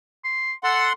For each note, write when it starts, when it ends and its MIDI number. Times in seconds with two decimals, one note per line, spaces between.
0.25 0.53 84
0.64 0.88 69
0.64 0.93 78
0.64 0.93 84